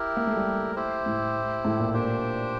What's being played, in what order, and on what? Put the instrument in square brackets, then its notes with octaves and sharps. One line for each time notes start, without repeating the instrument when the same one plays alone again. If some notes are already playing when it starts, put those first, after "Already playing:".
Already playing: [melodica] E4 G4 A#4
[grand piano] A#3
A3
G3
[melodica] E4 G4 C5
[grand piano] A2
A2
A#2
[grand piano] A#2 [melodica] D4 G4 C5